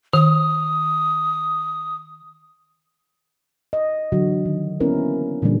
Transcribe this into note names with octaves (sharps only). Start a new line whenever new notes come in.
D#3 D#6
D#5
D3 E3 F#3 F#4
D#3
A#3 B3 C#4 E4 A#4 C5
A#2 D3 E3 G3 A#3